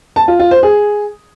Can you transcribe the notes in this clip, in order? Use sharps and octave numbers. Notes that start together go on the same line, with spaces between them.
A5
F4
F4
C5
G#4